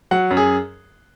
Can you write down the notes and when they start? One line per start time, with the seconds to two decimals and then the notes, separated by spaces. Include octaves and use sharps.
0.11 F#3 F#5
0.31 F#2
0.37 G#4